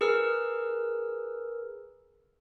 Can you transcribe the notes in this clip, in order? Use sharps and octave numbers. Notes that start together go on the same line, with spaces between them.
G#4 A#4 B4 E6 F6